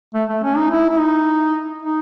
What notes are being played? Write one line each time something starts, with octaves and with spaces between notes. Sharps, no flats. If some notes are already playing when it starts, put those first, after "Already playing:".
A3
A3
C#4
D#4
E4
E4
D#4
D#4